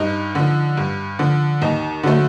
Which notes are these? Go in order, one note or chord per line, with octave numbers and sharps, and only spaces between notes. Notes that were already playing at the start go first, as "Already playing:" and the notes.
Already playing: G2 D#4
D3 F3
G2
D3 F3
D#2 D#4
D3 F#3 A3